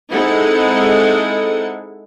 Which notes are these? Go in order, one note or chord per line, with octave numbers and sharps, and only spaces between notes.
G#3 C4 D#4 E4 A4 F#5